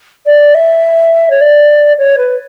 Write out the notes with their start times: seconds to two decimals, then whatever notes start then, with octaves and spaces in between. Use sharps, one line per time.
0.26 D5
0.54 E5
1.29 C#5
1.40 D5
1.98 C#5
2.17 B4